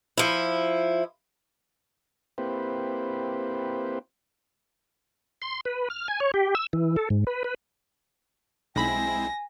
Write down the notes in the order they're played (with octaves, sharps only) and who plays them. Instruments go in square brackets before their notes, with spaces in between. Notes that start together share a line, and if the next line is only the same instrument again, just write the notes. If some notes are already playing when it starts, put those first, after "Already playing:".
[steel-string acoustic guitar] F3 E4
[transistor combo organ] A#3 C4 E4 G4 B4 C5
[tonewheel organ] C6
B4
F6
G#5
C#5
G4
E6
E3
A4
G#2
B4
B4
[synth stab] B1 B5 [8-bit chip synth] G#3 C4 E4 [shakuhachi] G#5 [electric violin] A#6